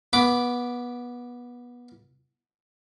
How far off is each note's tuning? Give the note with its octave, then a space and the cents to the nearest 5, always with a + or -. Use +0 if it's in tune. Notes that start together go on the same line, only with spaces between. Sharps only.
B3 -20 B5 +0 D6 +0